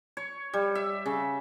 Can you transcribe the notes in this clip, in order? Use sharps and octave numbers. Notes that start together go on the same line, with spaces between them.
C#5
G3
E5
C#3